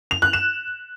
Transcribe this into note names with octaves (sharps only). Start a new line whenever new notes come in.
F7
F#6
E7